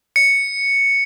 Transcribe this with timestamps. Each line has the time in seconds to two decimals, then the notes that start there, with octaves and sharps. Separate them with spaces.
0.16 C#7